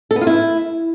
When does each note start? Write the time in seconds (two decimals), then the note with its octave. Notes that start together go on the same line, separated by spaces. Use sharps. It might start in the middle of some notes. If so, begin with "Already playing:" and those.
0.11 A4
0.16 B3
0.21 F4
0.27 E4